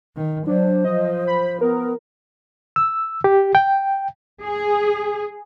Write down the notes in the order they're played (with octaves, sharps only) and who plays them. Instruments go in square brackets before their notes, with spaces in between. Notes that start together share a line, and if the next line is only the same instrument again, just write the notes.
[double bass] D#3
[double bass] F#3 [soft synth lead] D4 [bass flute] C5
[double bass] F3 [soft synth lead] D#5
[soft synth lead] B5
[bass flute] B3 [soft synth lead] A#4
[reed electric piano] E6
G4
G5
[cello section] G#4